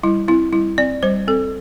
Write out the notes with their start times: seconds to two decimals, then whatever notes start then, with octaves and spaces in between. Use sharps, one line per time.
0.03 G3 E4
0.28 C4 E4
0.53 G3 E4
0.78 C4 D5
1.03 G3 C5
1.28 C4 A4